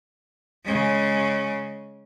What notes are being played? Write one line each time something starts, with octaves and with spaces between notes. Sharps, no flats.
C#3 G#3